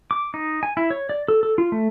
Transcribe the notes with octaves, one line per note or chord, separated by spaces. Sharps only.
D6
D#4
G#5
E4
C#5
D5
A4
A4
F4
A3